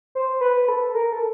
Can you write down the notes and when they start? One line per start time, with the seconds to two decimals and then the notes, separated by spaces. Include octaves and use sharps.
0.15 C5
0.41 B4
0.68 A4
0.95 A#4
1.13 A4